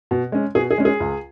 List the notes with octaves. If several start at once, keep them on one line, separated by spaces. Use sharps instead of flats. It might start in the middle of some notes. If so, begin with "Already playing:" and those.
B2
G#3 C#4
B2 G#4
G#4
G#3 C#4
G#4
C#2